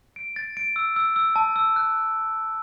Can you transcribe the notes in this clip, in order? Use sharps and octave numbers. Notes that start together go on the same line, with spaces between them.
D7
A6
D7
E6
E6
E6
A5
E6
F#6